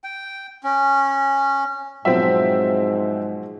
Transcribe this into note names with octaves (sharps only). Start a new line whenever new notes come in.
G5
C#4
G#2 B2 F3 F#3 C4 E5